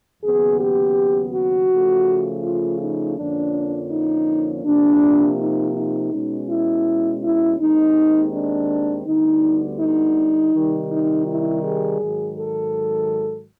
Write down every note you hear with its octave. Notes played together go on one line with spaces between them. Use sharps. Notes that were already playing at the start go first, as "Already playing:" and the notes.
D#2 C#3 F#3 B3 G#4
G4
F#4
C#3 F3 A3
F4
D#4
F2 D3 F3 A#3 C#4 D4
D#4
C3 F3 A#3 D4
D#4
D#4
B2 G#3 C#4
E4
E4
D#2 D#3 G#3 C4 D#4
D4
D2 D3 G3 B3 D#4
D#4
C3 D#3 G3
D#4
E4
G#4
G#2 D#3 F#3
A4